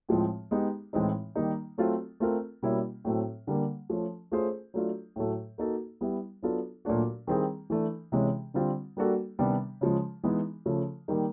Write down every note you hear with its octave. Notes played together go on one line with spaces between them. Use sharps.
A2 F3 G#3 C4
G#3 B3 D#4 G4
A2 E3 G#3 C4 D#4
D#3 G3 A#3 D#4
F#3 A3 C4 F4
A3 C4 F4 A#4
B2 G3 A#3 C#4 E4
A2 F#3 A3 C4
D3 G3 A#3
F3 A3 C#4
A3 C#4 F4 G#4 C5
F#3 A3 D4 F4
A2 F#3 A3
A#3 D#4 F#4 A4
G3 B3 E4 G4
F#3 B3 D4 F4 A4
A#2 F#3 A3 D4 F#4
D#3 G3 C4 E4 G#4
E3 A3 D4
C3 E3 G#3 C#4
D3 G3 C4 F4
G3 A#3 D4 F#4 A4
C3 D#3 G3 B3 D4
C#3 F3 G#3
E3 G#3 B3 D#4
C#3 F3 A3
D#3 G3 A#3 D#4